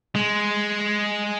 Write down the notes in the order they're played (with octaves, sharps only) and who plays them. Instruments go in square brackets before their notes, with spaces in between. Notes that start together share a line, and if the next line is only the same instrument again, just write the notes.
[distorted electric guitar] G#3